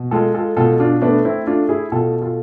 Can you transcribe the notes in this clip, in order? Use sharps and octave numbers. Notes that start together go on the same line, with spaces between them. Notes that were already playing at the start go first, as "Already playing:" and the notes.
Already playing: B2
G#3 F4 A4
F4 A4
B2 F4 A4
D4 F4
A3 B3 D4
C4 E4
A3 D4 F4
E4 G#4
B2 F4 A4
F4 A4